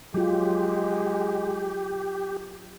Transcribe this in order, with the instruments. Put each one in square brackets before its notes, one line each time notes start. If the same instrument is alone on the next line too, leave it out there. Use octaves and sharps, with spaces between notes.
[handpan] F#3 F4 [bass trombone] G#3 [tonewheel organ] G4